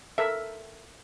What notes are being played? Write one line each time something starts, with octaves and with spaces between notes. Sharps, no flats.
A4 A#4 E5